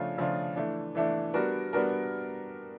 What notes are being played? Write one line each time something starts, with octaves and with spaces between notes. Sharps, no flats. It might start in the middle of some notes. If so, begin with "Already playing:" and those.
Already playing: C#3 F3 A3 D4 F4
C#3 F3 A3 D4 F4
E3 A3 D4
E3 A3 D4
G3 B3 D4 F#4 A#4
G3 B3 D4 F#4 A#4